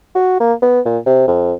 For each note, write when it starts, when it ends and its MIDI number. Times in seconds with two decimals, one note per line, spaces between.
0.15 0.38 66
0.40 0.53 58
0.62 0.80 59
0.85 0.98 46
1.06 1.26 48
1.28 1.53 41